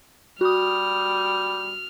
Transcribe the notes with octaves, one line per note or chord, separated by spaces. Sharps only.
G3 F#4 D#6 F6